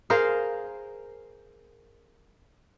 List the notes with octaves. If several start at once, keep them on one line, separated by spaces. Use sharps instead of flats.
G#4 A#4 C5 F5